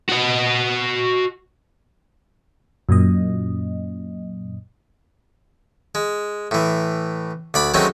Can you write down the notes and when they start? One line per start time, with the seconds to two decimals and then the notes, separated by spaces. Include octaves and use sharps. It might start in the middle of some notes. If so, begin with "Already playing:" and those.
0.09 F#4 D#5
2.89 F#2 A#2 D#5
5.95 G#3
6.51 A2 E3
7.54 D2 D5 B5
7.74 D#3 F#3 G#3 A3 C4 C#4